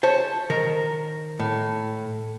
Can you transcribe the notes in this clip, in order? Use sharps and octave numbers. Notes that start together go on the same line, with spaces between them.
C5 C#5 A5
D#3 A#4
A2